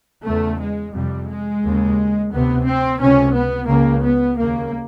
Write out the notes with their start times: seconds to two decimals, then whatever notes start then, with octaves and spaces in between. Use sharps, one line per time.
0.25 E2 C#3 A3
0.60 G#3
0.94 F2 C3 G3
1.29 G#3
1.63 D#2 C#3
2.31 D2 C3 B3
2.66 C4
3.00 C#2 C3 C#4
3.35 B3
3.68 C#2 C#3 A#3
4.03 B3
4.37 D#2 C#3 A#3